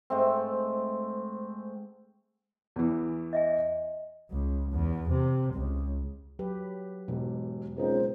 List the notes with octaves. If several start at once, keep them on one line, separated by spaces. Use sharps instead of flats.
G#2 A3 C4
E2 E3
D#5 E5 G#5
C#2
E2
C3
C#2
F#3 G4 B4
E1 G#2 B2
C#2 C4 D#4 A#4 C5